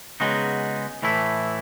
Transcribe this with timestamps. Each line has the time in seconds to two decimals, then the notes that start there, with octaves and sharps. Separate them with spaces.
0.20 C#3 G#3 B3 D#4 F#4
1.02 A2 E3 A3 E4